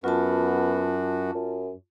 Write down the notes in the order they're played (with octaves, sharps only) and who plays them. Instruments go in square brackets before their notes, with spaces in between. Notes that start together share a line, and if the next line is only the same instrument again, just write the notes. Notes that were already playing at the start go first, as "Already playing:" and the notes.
[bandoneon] F#2 F#4 [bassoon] B3 [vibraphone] F4 A5
[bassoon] F#2